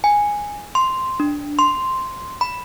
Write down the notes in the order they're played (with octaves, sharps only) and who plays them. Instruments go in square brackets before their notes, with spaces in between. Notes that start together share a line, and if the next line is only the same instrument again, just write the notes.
[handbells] G#5
C6
D4
C6
B5